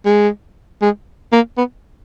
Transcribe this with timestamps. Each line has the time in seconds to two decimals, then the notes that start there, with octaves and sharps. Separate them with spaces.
0.06 G#3
0.82 G#3
1.32 A#3
1.58 B3